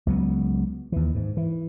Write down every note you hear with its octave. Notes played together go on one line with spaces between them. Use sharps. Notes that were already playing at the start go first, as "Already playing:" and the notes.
C#2 F#3 B3
D#2 E3
G#2
E3